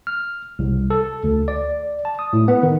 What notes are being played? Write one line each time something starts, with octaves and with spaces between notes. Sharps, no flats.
F6
C2
A4
D2
D5
A5
D#6
A2
B3
D#3